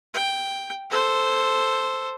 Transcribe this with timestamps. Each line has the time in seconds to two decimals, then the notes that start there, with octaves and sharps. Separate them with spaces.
0.14 G5
0.90 A4 C5